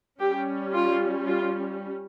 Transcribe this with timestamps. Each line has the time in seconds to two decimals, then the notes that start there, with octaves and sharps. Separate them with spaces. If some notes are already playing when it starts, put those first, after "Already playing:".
0.20 G3 C#4 G4
0.74 F4
1.27 F4